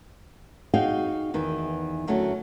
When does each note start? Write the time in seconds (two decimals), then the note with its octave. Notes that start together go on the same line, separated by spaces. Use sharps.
0.74 D#4 F#4 G#4 F5 G5 G#5
1.34 E2 D#3 E3
2.07 D2 F#3 A3 C#4